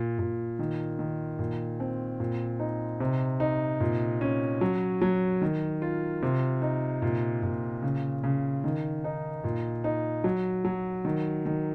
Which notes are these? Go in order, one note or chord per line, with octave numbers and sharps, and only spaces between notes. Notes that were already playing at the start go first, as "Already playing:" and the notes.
Already playing: A#2
A#2
D#3
D#3
A#2
C4
A#2
D#4
C3
D#4
A#2
C#4
F#3
F#3
D#3
F4
C3
D#4
A#2
A#2
C#3
C#3
D#3
D#4
A#2
D#4
F#3
F#3
D#3
D#3